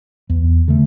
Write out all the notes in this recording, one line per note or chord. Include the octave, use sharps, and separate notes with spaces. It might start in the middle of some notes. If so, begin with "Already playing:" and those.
E2
D3 A3